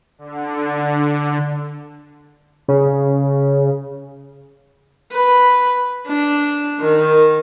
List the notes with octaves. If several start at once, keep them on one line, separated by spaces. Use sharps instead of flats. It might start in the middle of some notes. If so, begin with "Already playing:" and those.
D3
C#3
B4
D4
D#3